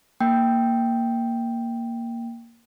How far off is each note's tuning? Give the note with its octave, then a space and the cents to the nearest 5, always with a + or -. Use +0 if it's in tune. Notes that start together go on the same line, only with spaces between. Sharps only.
A#3 +0 G5 +0